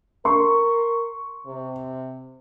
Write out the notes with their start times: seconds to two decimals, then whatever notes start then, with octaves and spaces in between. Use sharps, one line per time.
0.25 A#4 C6 C#6
1.46 C3